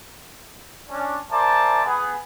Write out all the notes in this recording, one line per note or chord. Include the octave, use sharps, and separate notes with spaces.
C#4 D4
A#4 C5 D5 E5 G#5 A5
B3 G#4